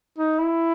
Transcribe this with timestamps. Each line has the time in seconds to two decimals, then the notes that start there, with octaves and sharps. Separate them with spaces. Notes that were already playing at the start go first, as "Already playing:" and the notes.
0.18 D#4
0.39 E4